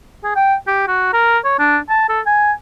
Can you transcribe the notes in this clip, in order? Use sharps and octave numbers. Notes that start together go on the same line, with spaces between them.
G#4
G5
G4
F#4
A#4
C#5
D4
A5
A4
G#5